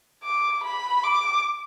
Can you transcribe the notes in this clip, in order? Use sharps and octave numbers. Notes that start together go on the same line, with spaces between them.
D6
B5
D6